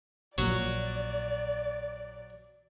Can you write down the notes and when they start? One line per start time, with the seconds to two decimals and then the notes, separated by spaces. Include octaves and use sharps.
0.38 A#1 A#2 F#3 D5